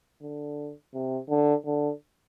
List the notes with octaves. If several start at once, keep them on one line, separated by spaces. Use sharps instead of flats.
D3
C3
D3
D3